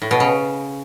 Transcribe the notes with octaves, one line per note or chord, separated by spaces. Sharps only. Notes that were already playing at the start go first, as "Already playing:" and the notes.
A2
B2
C#3